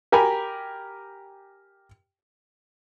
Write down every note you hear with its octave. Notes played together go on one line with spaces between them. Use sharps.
G4 A#4 G#5 B5